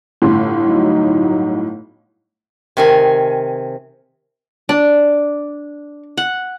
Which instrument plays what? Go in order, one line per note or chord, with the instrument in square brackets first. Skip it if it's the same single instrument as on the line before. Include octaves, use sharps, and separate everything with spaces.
[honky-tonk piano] G1 A2 C6
[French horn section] F#3 D#4
[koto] C3 D#3 G#5
[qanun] D4 [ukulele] D5
[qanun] F#5